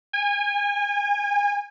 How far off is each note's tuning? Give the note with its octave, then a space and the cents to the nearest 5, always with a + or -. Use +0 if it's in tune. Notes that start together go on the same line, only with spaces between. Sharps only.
G#5 -30